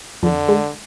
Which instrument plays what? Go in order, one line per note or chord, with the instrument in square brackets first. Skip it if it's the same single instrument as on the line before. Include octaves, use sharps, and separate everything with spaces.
[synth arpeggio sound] F2 [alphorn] D3
[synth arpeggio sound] G#3